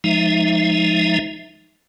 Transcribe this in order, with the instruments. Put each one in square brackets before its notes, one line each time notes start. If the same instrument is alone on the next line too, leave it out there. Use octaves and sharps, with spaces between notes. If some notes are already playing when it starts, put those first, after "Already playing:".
[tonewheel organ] F3 G#3 D#4 E5